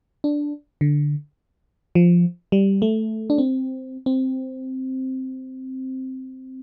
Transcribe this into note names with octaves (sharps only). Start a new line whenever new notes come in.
D4
D3
F3
G3
A3
D4
C4
C4